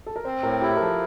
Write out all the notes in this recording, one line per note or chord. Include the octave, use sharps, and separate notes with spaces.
A4
A#4
C4 C5
A2 A#4
E4 G4
A#4
F3 A4